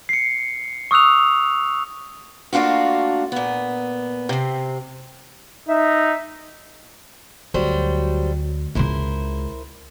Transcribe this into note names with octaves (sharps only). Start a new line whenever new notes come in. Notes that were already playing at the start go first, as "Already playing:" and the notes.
C7 C#7
C#6 D#6 E6 F#6 F7
A3 A#3 D4 F4 F#4
A#2 B3
C3 C4
D#4 E5
D2 F#3 G3 C5
C#2 C#3 E4 A#4 C5